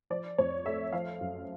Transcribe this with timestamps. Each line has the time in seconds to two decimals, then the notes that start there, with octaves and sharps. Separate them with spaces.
0.10 F3 D5
0.38 F2 C#5
0.65 A3 E5
0.92 F3 F5
1.21 F#2